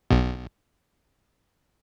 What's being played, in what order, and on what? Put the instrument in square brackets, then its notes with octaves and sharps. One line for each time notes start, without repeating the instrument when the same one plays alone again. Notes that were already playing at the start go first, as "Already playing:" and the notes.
[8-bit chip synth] B1 B2